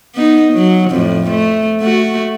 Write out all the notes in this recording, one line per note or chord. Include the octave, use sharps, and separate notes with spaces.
B3 D#4
F#3
F2 A2
A3
A3 F#4